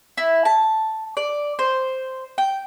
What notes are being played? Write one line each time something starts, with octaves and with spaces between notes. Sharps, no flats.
E4
A5
D5
C5
G5